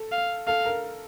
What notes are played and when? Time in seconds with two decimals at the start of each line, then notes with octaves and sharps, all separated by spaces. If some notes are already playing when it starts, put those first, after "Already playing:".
Already playing: A4
0.12 F5
0.47 A4 F5
0.66 A#4